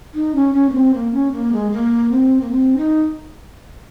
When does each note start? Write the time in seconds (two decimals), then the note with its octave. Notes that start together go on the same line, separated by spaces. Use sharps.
0.14 D#4
0.35 C#4
0.53 C#4
0.69 A#3
0.74 C4
0.94 A#3
1.13 C#4
1.32 A#3
1.53 G#3
1.72 A#3
2.11 C4
2.41 A#3
2.51 C4
2.77 D#4